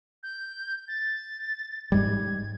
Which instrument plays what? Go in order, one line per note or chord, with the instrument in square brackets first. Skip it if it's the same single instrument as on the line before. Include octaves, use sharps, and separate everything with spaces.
[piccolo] G6
A6
[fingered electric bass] G#2 G3 [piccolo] G#6